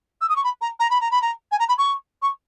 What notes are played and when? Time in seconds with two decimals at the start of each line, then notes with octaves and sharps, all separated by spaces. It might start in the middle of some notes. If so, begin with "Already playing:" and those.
0.21 E6
0.29 D#6
0.36 C#6
0.44 B5
0.61 A#5
0.80 A#5
0.90 B5
1.01 A#5
1.11 B5
1.22 A#5
1.52 G#5
1.59 A#5
1.69 B5
1.78 C#6
2.22 C#6